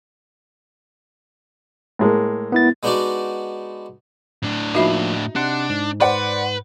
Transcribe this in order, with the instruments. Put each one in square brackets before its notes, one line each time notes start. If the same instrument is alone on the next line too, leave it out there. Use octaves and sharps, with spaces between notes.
[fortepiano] A2 G#3 A#3
[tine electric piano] B3 E4 A6
[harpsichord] G#3 B3 D4 D#4 F#4 D5
[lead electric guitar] A2 D4
[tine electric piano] F3 A#3 [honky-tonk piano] D#4 [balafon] F#4 E5 B5
[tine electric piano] C3 F#5 C6 [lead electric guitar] D4
[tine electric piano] G#2
[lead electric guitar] B4 [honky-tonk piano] C5 D5 F#5